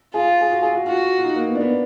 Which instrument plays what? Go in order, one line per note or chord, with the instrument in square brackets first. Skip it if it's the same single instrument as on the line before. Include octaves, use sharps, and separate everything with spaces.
[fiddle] F4 [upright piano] G#4
[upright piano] G#4
F#4
G#4
F#4
[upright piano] F4 [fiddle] F#4
[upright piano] F4
D#4
A#3
B3
D4
B3